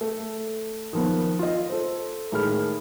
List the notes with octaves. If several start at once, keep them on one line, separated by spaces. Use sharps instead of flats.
A3
D#3 F3 B3
F4 D#5
A4 C5
A2 D#3 G#3 B5 F6